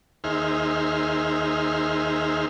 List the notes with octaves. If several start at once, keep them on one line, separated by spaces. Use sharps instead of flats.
D#2 D#4 G#4 C5 E5 F6